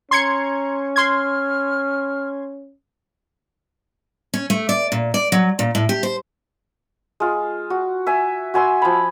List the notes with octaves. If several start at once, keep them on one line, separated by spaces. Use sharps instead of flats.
C#4 A#5 C6 G#6 C#7
C6 F6 G#6
C#4
A3
D5
A#2
D5
F#3
A#2
A2
G4
C5
G#3 F4
F#4
E5 G#5
F#4 G#5 C6 E6
F3 B5